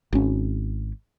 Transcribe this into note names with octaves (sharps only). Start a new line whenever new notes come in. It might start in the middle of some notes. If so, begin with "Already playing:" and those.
G#1 C#4